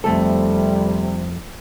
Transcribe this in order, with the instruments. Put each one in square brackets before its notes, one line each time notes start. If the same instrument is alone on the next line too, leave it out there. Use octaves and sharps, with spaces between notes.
[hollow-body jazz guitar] F2 A3 A4 [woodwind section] C3 G3